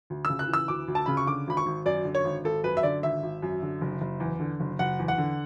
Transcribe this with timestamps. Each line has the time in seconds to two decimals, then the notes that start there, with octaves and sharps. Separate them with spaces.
0.10 D2
0.25 E6
0.30 C#3
0.39 F#6
0.48 E3
0.54 E6
0.68 D2 D6
0.88 D2
0.95 A5
1.06 C#3 B5
1.17 C#6
1.27 D3 D6
1.47 G#1 B5
1.57 C#6
1.66 G#1
1.86 F#2 D5
2.05 D3
2.15 C#5
2.25 G#1
2.44 G#1 A4
2.64 F#2 B4
2.77 E5
2.83 D3 D5
3.03 G#1 E5
3.23 G#1
3.42 F#2
3.62 D3
3.81 F#1
4.01 F#1
4.20 E2
4.40 D3
4.60 F#1
4.79 F#1 F#5
4.99 E2
5.08 F#5
5.18 D3